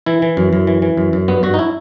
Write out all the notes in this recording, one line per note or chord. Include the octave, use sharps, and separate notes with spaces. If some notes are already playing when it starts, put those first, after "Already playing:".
E3 E4
E3
F#2
F#2
E3
E3
F#2
F#2
G2 B3
G2 F#4
D#4
E4